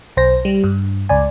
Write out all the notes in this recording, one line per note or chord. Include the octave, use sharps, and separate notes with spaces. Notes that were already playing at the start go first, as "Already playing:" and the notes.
B1 C5 A#6
G3
G2
C#2 D5 G#5